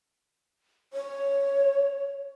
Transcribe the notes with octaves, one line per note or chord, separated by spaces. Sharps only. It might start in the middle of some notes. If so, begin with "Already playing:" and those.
C#5